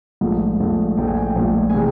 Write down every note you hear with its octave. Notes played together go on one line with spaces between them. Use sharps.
A#1 G#2 F3 A3
A#1 G#2 F3 A3
A#1 G#2 F3 A3 G5
G#5
G5
A#1 G#2 F3 A3
G#5
C3 E3 G#3 G5